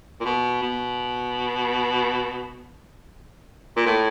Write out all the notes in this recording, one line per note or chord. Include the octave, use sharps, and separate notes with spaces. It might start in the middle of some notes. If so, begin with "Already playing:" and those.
A#2
B2
B2
A#2
A2